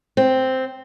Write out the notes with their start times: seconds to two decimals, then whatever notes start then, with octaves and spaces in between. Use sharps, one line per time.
0.17 C4